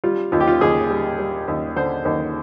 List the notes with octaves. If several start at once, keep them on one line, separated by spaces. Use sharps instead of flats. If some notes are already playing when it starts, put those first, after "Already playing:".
G3 F4
D#2 F4
G4
F4
D#2 G#4
G3
G3
D#2
D3 C5
D#2